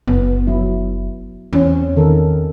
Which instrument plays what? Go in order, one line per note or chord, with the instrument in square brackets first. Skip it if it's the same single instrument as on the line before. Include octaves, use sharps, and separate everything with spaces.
[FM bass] F#1 [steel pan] B3
[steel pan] F#3 E4
[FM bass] E2 [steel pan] C4 C#4
[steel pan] D#3 A4 A#4